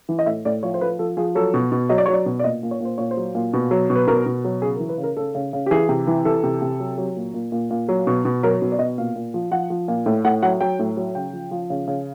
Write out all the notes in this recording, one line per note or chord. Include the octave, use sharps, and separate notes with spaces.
E3
D#5
A2 E5
A2 D5
F3 C#5
C5
F3 B4
F3 A4
F3 G#4
F#3 A4
B2
B2
F#3 D#5
D5
F#3 C#5
D5
B2
D5
A#2 D#5
A#2
C#5
A#2 C5
A#2 C#5
C5
F#3
A#2
B2
F#3
B2
B4
B2 A#4
B2
F#3
C#3 G#4
A#4
E3
B4
C#3
A#4
C#3 A4
C#3
C#3
G4
E3 G#4
C3
E3
E3 A4
C3
C3
F#3
F#3
A#2
A#2
A#2
A#2
F#3
B2
B2
F#3 A#4
B2
D5
B2 D#5
A#2 F5
A#2
F3
F3 F#5
F3
A#2
A2
A2 F#5
F#3 F#5
F#3 G5
A2
F#3
C#3 G5
F3
F3
C#3
C#3